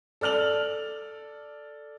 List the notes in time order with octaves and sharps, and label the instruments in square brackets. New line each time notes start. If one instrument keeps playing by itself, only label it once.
[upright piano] A4 D5 F6 F7 F#7